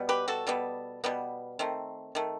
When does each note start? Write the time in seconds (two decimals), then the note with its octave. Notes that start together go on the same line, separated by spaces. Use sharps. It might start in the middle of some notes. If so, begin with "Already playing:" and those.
Already playing: B2 G3 B3
0.09 G4 B4
0.28 F#4 A4
0.47 B2 G3 B3
1.04 B2 G3 B3
1.59 D#3 A3 C4
2.15 D#3 A3